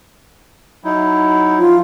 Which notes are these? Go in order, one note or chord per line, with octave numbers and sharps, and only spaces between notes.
F#3 D#4 E4
F3 F4